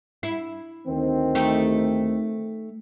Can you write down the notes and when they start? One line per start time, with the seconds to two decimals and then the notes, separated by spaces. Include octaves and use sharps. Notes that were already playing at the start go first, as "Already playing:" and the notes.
0.23 E4
0.87 D2 D#3 C4
1.35 A3 D#4 G4